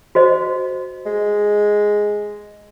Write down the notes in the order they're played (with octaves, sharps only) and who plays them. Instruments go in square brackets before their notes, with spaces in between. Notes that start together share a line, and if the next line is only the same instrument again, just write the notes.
[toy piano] F#4 C5 D#5
[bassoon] G#3